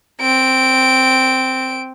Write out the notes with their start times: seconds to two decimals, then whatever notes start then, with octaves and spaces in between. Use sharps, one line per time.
0.21 C4 D7